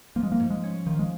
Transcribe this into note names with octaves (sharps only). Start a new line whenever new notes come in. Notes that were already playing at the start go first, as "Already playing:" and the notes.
F3 A#3
G#3
A#3
G#2
G#3
C#4
D#3 F3
G#3